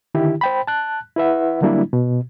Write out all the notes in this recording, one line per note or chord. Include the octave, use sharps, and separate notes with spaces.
D3 D#3 E4 G4
C5 G5 B5
A5 F#6
E4 B4 E5 F#5
D3 F#3 G3 A#3 D4 E4
B2